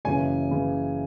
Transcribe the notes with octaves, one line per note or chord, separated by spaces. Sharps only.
F#1 F#2 C#3 E3 G#5
C#3 E3